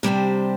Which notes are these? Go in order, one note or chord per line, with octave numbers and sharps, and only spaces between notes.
C3 G3 D4 G4 C5